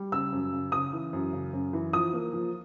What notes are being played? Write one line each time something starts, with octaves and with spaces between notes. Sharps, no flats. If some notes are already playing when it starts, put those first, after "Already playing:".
Already playing: G3
C#3 E6
F#2
C#3
C#3 D#6
E3
F#2
C#3
F#2
E3
F3 D#6
A#3
F3